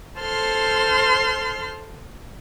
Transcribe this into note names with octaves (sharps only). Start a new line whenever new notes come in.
A4 C5 C6 F6